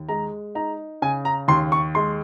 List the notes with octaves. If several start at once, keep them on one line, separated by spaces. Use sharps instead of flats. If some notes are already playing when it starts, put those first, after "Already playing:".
Already playing: D#2
G#3 A#5
D#4 A#5
C#3 G#5
A#5
D#2 C6
C#6
G#3 C6